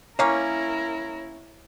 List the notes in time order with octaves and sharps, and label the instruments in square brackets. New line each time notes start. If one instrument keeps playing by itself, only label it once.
[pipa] A#3 C#4 [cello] E4 A#4 [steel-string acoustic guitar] C#5